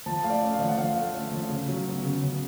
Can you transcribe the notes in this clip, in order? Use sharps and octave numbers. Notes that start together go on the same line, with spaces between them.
F3 A5
A3 F5
D5
C#4
F5
F3
F#5
F3 F5
A3
C#4
F3
C#3
F#3
B3
C#3
C#3